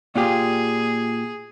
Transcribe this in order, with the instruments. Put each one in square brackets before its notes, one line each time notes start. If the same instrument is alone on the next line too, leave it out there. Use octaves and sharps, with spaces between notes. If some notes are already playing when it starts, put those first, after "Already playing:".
[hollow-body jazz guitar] A#2 F4 G4 [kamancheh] G#4